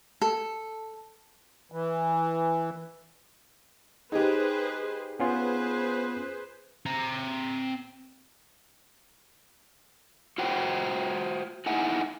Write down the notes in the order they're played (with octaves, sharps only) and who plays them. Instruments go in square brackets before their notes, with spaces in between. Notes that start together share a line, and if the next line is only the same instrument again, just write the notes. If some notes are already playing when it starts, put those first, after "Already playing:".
[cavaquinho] A4
[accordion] E3
[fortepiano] D#4 G4 [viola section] G#4 B4 C5
[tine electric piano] B3 C#4 F4 [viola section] G#4 B4 C5
[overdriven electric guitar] C4 A#5
[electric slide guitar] F4 F#4 C5 F#5 G5
D#4 E4 F#5 G#5